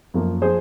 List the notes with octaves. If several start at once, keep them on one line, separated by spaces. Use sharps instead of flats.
F#2 F3 A#3
F3 G#4 C5